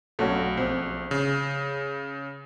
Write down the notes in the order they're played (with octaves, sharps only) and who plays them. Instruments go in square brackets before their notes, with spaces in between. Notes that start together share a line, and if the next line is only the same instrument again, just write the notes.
[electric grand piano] B1 [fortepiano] A3 C#4 F#4
[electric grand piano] A#1 [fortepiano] C4
[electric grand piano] C#3